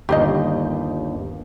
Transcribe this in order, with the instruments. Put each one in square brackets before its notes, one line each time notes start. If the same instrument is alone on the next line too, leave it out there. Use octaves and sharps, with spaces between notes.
[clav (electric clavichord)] G1 D#2 [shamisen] G4 C5 D#5